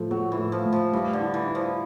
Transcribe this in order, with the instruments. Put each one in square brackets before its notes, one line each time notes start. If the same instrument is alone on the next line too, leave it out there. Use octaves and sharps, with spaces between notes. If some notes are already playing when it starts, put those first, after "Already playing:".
Already playing: [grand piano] A2 F3 A3
[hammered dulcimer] F#3 [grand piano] A3
[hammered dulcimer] E3
[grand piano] A2
[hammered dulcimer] F3
[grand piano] A2
[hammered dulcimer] F3
[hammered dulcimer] E3 [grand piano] G3
[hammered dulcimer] D3
[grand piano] E4
[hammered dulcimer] E3
[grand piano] E4
[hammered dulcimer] F3